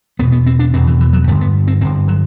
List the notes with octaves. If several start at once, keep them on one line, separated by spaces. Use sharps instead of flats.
E2 B2 B3
B3
C4
D4
E2 B2 C4
E3
E3
F#3
G2 D3 A3
B3
C4
G2 D3 C4
F#3